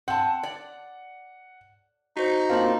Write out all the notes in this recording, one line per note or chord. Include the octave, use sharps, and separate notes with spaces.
C4 F#5 A5
D5
D#4 F#4 C5
A#3 C4 D4 F4 D5